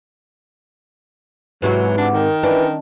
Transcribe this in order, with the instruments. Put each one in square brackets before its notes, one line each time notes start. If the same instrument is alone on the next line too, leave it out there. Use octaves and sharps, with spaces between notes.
[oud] G#2 C3 F#4 [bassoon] E3 [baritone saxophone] F#3
[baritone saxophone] D4 [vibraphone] F#5 D6
[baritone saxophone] D#3 [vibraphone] A#4
[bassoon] E3 [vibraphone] C#4 D#5 [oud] D4